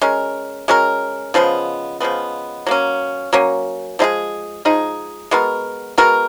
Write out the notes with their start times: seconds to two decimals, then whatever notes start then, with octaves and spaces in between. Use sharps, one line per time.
0.01 G#3 C#4 F#4 A#4
0.68 G#3 C#4 F#4 A#4
1.34 C#3 F3 G#3 B3
2.00 C#3 F3 G#3 B3
2.66 F#3 A#3 C#4
3.33 F#3 A#3 C#4
3.99 F3 G#3 D#4 G#4
4.65 F3 G#3 D#4 G#4
5.31 G#3 B3 F#4 A#4
5.98 G#3 B3 F#4 A#4